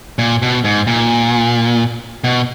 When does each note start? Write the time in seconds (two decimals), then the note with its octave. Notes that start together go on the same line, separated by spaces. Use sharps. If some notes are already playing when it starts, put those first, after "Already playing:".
0.19 A#2
0.42 B2
0.64 G#2
0.87 A#2
2.24 B2